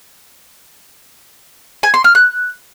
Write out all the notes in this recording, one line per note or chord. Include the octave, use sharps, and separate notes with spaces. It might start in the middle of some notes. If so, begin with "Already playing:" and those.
G#5
C6
F6
F#6